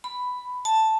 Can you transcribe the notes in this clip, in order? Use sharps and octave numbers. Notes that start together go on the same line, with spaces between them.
B5
A5